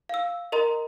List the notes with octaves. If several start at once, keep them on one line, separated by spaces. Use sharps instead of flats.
F5 E6
A#4 D#5 A#5 C6